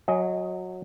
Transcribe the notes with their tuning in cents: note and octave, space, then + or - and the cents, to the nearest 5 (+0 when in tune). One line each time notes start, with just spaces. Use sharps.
F#3 -15 D#5 +15 G#5 +10